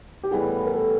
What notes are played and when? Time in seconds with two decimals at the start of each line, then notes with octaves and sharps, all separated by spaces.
0.23 G4
0.31 A2 E3 G3 B3 G#4
0.66 A#4
0.73 A4